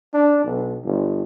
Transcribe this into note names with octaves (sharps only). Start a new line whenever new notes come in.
D4
B1
G1